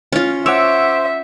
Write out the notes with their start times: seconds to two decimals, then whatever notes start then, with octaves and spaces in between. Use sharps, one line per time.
0.12 C#4 F4
0.46 C5 C#5 E5 F#5 D6 E6